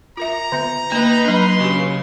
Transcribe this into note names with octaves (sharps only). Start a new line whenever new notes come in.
F4 A#4 E5 A#5
D3 B3 E5
A#3 D#4 B4 D#5 B5
F#3 D4 C6
C#3 F#4 G4